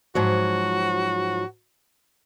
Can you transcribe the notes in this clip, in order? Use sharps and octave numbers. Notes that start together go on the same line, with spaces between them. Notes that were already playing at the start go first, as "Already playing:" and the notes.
G#2 F3 F#3 F#4